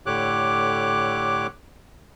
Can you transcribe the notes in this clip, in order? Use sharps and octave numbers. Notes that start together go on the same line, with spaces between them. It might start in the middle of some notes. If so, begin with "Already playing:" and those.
A2 D3 G4 C#5 D6 F#6